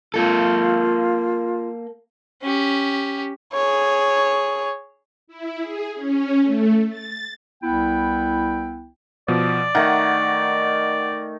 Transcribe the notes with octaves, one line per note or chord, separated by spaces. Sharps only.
A#3 F4 A4
C#4 G4
G#4 C#5
E4
G#4
C#4
A3
A6
C2 B3 E4 G5
B2 F3 D5
D#3 A3 F#5